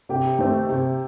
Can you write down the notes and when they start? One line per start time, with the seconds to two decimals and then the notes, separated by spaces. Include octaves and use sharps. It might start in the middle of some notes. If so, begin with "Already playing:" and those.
0.09 C3 G4
0.39 D#3 A3 C4
0.69 C3